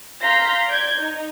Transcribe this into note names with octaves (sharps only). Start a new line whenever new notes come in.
F5 A#5 C6 G6 A#6 B6
D5 G6 G#6
D#4